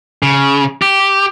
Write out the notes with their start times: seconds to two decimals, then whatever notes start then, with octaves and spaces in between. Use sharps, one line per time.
0.23 C#3
0.82 G4